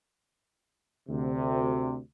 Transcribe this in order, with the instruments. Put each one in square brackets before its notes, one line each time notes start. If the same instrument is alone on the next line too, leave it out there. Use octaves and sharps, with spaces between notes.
[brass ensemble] D2 C3